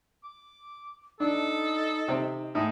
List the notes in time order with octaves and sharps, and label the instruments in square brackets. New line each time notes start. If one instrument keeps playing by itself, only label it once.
[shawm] D6
[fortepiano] D4 [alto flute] D#4 [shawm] A4
[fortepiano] C3 C4
[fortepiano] A2 D#4 E4 [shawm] G#4